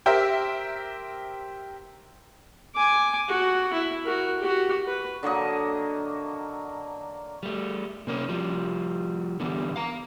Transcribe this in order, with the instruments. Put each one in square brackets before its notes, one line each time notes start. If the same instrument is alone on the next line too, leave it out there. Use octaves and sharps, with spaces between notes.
[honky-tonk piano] G4 A#4 C5 E5
[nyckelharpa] G#5 D6
F#4
E4
F#4 A#4
F#4 G4
B4
[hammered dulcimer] D3 F#3 A#3 D#5
[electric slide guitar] G3 A3
C3 A#3 C#4
F3 G3
D3 E3 G3 B3
F5 A#5